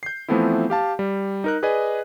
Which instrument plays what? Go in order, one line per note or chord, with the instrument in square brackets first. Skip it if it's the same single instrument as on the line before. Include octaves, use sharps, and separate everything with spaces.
[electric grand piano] G6 C7
E3 F3 A3 B3 C4 E4
G4 F5 A5
G3
D#4 A#4 F#6
G#4 B4 D5 D#5 G#5